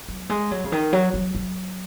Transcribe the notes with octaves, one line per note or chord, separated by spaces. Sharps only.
F#3
G#3
F#3
C#3
D#3
F#3
F#3
F#3